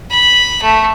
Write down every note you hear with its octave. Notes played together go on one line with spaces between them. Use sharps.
B5
A3